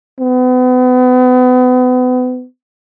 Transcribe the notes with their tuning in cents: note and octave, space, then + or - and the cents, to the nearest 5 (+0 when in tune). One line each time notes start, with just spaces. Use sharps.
B3 +35